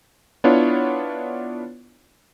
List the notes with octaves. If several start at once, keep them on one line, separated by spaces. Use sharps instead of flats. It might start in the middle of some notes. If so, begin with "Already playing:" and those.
B3 D4 E4 F4 C#5